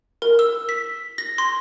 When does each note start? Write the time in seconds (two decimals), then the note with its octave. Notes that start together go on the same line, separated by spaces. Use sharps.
0.22 A#4
0.39 E6
0.69 B6
1.18 A#6
1.38 C6